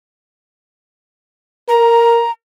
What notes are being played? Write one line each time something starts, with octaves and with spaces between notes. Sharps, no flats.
A#4 A#5